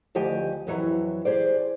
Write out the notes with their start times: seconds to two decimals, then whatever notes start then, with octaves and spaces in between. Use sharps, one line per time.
0.15 D2 D#3 F3 G4 G5 G#5
0.67 F2 E3 F#3 E5
1.25 G4 G#4 C5 D5